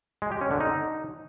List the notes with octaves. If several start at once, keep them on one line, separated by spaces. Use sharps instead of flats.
G#3
G4
C#4
D3
D#4